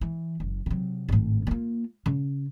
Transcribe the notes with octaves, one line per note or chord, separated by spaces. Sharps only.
E3
F#1
C3 F#3
G#1 A2
A#3 F4
C#3